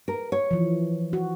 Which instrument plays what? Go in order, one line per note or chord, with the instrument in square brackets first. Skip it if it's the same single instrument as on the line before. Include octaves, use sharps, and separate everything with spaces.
[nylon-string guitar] A#4
C#5
[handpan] E3 F3
F#4